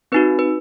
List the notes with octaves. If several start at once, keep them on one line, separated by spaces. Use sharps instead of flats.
C4 D#4 F#4 B4
B4